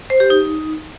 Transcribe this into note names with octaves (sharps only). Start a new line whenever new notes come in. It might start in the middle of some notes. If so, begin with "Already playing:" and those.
C5
G4
D#4